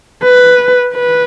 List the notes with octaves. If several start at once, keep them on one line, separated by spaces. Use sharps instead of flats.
B4
B4